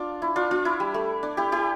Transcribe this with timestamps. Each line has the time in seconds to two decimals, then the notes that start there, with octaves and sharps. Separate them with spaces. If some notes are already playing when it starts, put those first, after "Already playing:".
Already playing: D4 F4
0.22 E4
0.36 D4 F4
0.51 D4 F4
0.65 E4
0.80 G3
0.94 A3
1.23 D4
1.37 E4 G4
1.52 E4 G4